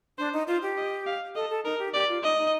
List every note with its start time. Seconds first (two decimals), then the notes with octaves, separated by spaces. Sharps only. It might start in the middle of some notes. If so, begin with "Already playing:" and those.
0.18 D4 C5
0.33 D#4
0.47 F4 C5
0.62 G4
0.77 D#5
1.07 F5
1.35 A4 D#5
1.50 A4
1.65 D#4 A#4
1.79 G4
1.94 G4 D5
2.09 F4
2.23 D#4 D#5
2.38 D#4